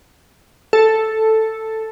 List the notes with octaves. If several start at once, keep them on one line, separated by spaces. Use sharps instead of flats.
A4